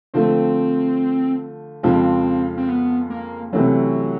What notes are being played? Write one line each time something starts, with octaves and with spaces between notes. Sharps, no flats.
D3 F3 A3 C4
F2 C#3 F3 G#3 C4
C4
B3
A#3
C3 E3 F#3 A3 C#4